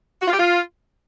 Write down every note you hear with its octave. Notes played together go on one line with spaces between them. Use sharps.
F#4
F4
G4
F4